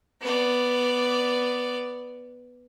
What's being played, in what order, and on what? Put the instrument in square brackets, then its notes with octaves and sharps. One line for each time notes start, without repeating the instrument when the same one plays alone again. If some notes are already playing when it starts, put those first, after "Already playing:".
[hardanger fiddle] B3 D5